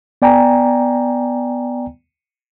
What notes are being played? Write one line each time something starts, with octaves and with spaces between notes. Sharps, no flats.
B3 D5 G5 G#5 A#5